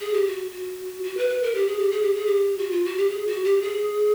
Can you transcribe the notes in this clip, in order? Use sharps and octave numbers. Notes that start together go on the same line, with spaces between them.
G#4
G4
F#4
F#4
F#4
B4
B4
A#4
G4
G#4
G4
G#4
G4
G#4
G4
F#4
F4
F#4
G4
G#4
F#4
G4
G#4